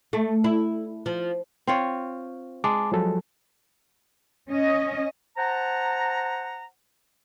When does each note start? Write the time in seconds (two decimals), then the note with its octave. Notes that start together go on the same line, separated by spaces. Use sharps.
0.13 A3
0.44 E4
1.06 F3
1.67 C4 F4 C#5
2.64 G#3 A5 D6
2.92 F3 F#3 A4
4.50 C#4 D#5
5.37 C5 F#5 A5 A#5